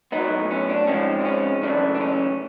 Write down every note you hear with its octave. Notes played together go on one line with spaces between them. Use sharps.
A2 F#3 B3 D#4
C#4
D4
G#2 F3 G#3 C4 C#4
D4
C#4
F#2 C#3 E3 A3 D4
D4
C#4